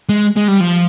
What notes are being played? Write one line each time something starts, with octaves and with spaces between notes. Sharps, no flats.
G#3
G#3
G3
F3